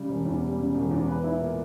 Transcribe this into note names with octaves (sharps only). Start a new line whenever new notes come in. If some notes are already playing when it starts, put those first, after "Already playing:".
Already playing: C#3 G3
E1
E2
G3
C#3
E1
E2
B4
E4
A#2